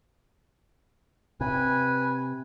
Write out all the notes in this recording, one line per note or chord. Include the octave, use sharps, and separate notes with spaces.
C3 B4 G#5